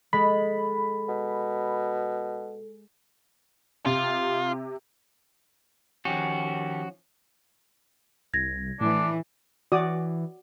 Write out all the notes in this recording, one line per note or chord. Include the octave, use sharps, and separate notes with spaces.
G#3 A4 B5
B2
C3 F4
D#3 F3 C#4 F#4 G4
C2 G#6 A#6
A2 E3 D4
E3 F#4 D5 D#6